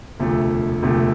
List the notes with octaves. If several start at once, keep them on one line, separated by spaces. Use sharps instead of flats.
E1 D2 C3 F3 A3
E1 D2 C3 F3 A3